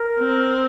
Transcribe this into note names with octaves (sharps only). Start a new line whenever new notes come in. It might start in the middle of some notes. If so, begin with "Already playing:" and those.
Already playing: A#4
C4